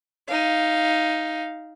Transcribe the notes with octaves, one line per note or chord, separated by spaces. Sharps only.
D#4 F5